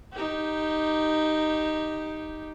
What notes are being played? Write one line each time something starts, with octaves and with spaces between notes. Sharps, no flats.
D#4 G4